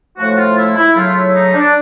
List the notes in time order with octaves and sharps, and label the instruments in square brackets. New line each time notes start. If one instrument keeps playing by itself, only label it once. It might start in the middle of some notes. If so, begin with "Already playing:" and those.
[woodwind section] A2 F3 A3 F#4
F#4
F4
E4
E4
C#3 F#3 A3 F4
E4
D#4
D4